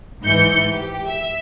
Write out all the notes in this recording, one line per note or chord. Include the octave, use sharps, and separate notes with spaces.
G#2 E3 G6 C#7
G4
E5